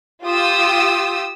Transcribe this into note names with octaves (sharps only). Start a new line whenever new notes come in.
F4 G4 D#6 E6